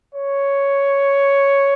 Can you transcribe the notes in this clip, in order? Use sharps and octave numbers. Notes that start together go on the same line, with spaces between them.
C#5